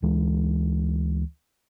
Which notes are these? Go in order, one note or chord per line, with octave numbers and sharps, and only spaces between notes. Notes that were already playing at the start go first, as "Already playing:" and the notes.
D2 E3 G#3